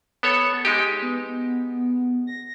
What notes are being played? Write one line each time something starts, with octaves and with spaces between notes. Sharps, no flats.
B3 A4 C#5
G#3 D#4 G4
B3
A#6